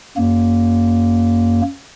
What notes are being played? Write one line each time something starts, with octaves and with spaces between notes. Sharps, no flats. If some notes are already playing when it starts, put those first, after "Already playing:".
F#2 A#3